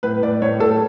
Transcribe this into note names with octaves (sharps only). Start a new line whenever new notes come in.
A2 B4
A2 D5
A2 C#5
A2 A4